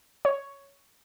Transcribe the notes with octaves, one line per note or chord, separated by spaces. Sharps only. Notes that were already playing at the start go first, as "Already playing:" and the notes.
C#5